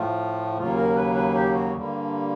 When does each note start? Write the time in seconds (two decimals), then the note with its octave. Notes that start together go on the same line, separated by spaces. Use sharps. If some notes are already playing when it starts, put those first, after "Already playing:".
Already playing: A2 F3 A3 F4
0.57 D#2 C#3 F#3 A#3 F4
0.76 A#4
0.96 B4
1.15 B4
1.34 G4
1.53 F#4
1.73 G2 D3 G3 A#3